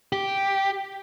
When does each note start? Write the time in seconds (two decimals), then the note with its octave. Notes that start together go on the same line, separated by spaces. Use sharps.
0.13 G4